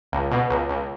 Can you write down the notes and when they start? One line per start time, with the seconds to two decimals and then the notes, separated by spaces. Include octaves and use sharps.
0.12 C#2
0.31 B2
0.50 C#2
0.69 C#2